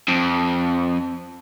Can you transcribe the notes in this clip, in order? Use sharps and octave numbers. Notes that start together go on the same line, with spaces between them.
F2